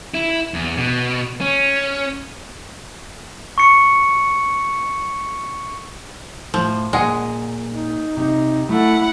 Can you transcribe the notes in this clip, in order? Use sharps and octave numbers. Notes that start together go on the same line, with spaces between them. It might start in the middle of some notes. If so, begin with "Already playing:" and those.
E4
E2
B2
C#4
C#6 C#7
A2 F3
A#2 G#3 F#5 G#5
D#4
C3 D#4
A3 E4 A4 F#5